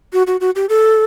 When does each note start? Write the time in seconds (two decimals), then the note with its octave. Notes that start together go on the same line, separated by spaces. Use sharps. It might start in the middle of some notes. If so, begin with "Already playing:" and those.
0.13 F#4
0.27 F#4
0.41 F#4
0.56 G4
0.69 A4